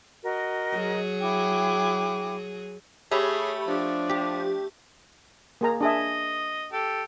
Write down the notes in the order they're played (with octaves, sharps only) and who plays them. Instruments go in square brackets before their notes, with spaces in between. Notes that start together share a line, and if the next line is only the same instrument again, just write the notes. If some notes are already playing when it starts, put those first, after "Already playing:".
[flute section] F#4 A#4 D#5
[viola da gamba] F#3 G#4
[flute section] E4 G5 D6
[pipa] A3 [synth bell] G4 C#5 B5 [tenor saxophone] G#4
[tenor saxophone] F3 [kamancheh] D4
[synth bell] G4
[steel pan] A#3 G#4 A#5
[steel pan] D4 G#4 E5 [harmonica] D#5
[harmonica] G4 A4